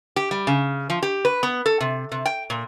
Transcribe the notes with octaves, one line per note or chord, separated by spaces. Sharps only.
G4
G3
C#3
F3
G4
B4
B3
A4
C3
C3
G5
A#2